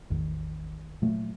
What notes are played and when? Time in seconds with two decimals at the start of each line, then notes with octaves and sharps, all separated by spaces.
0.10 A1 E2 D#3
1.02 A#2 F#3 A3 A#3